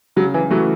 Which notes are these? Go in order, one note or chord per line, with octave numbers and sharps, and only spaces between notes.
C#3 F#3
E3
E3 F#3 A3 F#4